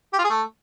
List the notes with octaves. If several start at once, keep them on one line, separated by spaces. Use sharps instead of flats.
G4
F4
G#4
A3